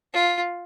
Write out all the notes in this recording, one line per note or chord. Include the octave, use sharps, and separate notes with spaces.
F4